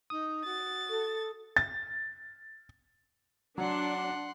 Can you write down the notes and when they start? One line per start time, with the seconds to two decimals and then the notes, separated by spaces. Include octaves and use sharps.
0.10 D#4 D#6
0.44 F#4 A6
0.90 A4
1.57 A6
3.58 F#3 D4 F#5 C6